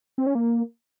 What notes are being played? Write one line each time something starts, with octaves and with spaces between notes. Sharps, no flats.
C4
C#4
A#3